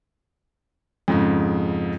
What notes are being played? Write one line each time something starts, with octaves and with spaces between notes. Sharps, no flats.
F2 G#2 C#3